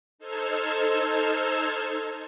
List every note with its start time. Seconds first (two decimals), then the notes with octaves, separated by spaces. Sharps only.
0.19 D#4 A4 C5 E6 F6 G#6